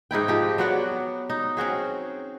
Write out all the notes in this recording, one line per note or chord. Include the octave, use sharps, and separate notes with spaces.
G#2 D#4 E4 G5
F3 C4 G4
F#3 B3 F#4 D5
D#4
C4 C#4 F#4 G#4